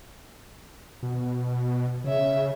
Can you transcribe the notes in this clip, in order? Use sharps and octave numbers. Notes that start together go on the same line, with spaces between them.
B2
C#3 C#5 E5